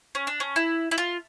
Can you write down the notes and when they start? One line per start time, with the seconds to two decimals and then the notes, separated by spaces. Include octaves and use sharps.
0.15 C#4
0.27 D4
0.40 C#4
0.56 E4
0.91 E4
0.98 F4